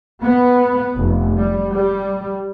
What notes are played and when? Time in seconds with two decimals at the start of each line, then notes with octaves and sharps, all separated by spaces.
0.22 B3
0.97 F1
1.37 G3
1.72 G3